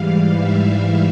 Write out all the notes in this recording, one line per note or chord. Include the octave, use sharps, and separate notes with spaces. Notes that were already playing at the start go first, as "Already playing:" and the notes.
Already playing: G#2 E3 G3 F5
E5